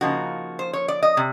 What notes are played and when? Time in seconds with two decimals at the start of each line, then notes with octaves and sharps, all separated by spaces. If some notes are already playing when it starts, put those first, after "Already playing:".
0.01 C#3 F3 A#3 D#4 F#4
0.59 C5
0.73 C#5
0.88 D5
1.03 D#5
1.17 C3